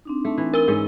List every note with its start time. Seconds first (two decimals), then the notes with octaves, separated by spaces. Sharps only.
0.05 C4 D4 D#4
0.25 A3
0.38 E3
0.54 A#4 E6 G7
0.68 G#2 C#4